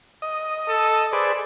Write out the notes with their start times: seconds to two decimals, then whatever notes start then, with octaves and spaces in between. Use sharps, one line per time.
0.22 D#5
0.69 A4
1.13 G#4 B4 C5 D5